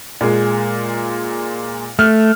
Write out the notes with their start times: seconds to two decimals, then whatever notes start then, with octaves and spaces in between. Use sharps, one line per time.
0.21 A#2 G#3
1.99 A3 F6